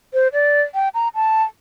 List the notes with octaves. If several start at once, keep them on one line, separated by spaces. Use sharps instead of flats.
C5
D5
G5
A#5
A5